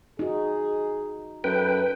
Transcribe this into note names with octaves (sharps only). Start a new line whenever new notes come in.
D#4 F#4 G#4
F#2 A4 B4 G5